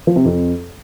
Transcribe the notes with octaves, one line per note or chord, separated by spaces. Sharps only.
F3
C3
F2